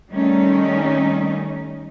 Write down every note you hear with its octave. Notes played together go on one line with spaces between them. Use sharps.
D#3 G3 A3 C#4 D#4